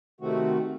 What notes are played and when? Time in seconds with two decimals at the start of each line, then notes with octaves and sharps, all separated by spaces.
0.21 C3 D#3 A3 C4 F#4